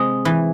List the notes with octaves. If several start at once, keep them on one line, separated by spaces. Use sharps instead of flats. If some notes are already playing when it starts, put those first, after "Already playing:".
Already playing: C3 G#3 D#5
E3